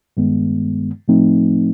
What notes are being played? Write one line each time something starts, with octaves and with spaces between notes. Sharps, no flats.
G2 D#3 G#3 B3
A2 F3 A3 C4 D#4